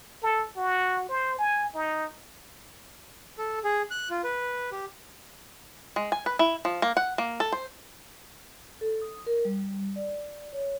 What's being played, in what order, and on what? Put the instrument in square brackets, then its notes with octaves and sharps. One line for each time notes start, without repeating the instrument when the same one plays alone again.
[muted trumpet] A4
F#4
C5
G#5
D#4
[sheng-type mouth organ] A4
G#4
F#6
F4
B4
G4
[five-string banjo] G#3
G#5
B4
E4
F3
A#3
F#5
A#3
A4
C5
[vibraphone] A4
D#6
A#4
G3
D5
C#5